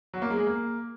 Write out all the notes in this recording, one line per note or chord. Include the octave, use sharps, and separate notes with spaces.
F#3
A#3
G#3
G#4
A#3